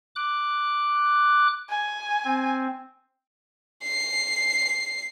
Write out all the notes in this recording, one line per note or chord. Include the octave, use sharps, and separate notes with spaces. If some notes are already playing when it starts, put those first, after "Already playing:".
D6 F#6
G#5
C4
C7